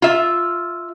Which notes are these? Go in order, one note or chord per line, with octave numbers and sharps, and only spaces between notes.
F4 E5